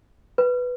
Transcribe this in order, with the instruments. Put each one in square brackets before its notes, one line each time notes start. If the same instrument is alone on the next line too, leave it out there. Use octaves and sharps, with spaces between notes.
[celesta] B4